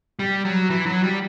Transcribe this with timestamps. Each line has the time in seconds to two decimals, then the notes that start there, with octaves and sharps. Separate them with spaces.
0.19 G3
0.45 F#3
0.70 E3
0.86 F#3
1.03 G3